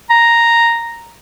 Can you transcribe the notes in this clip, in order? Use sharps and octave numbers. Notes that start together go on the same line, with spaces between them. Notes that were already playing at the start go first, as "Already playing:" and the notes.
A#5